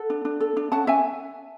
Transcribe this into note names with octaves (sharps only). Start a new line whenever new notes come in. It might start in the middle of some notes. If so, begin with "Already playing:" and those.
Already playing: A4 F#5
D4
D4
A4
D4
C#4 F#5 A5
C#4 E5 G#5